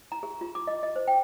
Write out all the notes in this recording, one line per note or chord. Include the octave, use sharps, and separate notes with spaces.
A#5
G#4
F4
D6
D#5
D#5
C5
G5